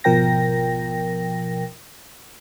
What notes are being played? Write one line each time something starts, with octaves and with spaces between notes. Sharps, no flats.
G#1 B2 F3 A#4 G5 A#6